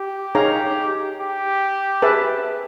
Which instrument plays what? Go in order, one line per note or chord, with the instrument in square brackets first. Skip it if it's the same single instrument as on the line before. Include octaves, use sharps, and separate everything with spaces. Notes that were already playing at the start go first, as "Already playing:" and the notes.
Already playing: [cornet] G4
[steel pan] D#4 G#4 C#5 F5 A#5
[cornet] G4
[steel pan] G#4 B4 E5 A5